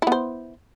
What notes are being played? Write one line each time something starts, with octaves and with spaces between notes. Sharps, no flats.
B3 E4 C5